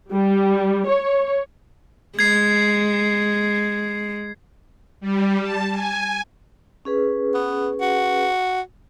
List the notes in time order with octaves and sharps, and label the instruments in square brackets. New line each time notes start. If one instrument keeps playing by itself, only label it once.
[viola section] G3
C#5
[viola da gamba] G#3 [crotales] G#6 C7
[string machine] G3
A5
G#5
[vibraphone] C#4 G#4 B4
[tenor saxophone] B3
F#4